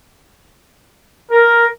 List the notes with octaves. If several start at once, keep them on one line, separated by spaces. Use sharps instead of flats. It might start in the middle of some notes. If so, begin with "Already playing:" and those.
A#4